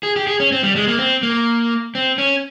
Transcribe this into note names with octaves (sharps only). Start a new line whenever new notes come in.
G#4
G4
G#4
C#4
C4
G3
G#3
A#3
C4
A#3
C4
C#4